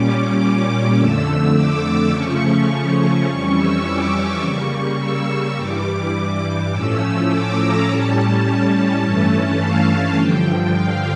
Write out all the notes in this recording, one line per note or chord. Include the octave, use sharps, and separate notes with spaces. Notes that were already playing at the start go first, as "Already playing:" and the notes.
Already playing: A#2 G3 C#4 D6
D6
F2 D3 A3 E6
D6
C#3 F3 A3 C#4 C#6
C#6
F2 E3 G3 C#4 C#6
E6
D6
C#3 G3 A#3 C#6
C#6
E6
G2 E3 G3 D6
A2 F3 A3 C#4 E6
D6
A#5
A2 G3 C#4 A5
G2 E3 A3 C#4
F5
G2 D3 F3 G5
F5